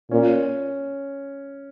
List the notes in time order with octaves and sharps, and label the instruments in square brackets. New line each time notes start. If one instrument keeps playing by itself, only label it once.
[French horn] A#2 [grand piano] C#4